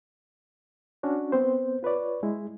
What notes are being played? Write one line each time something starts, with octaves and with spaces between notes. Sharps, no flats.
C#4 D4 F#4
B3 C4 C5
F4 B4 C#5 D5
G#3 E4